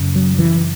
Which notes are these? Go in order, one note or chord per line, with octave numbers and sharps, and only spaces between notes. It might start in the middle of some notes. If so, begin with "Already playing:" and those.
Already playing: F#2 C#3
F#3
E3